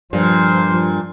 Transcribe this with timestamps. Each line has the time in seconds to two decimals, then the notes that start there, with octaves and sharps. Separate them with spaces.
0.13 G2 A#2 F3 C5